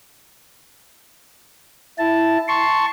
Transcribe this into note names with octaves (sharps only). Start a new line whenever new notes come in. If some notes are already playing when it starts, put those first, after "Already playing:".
E4 A5
A5 C6 C#6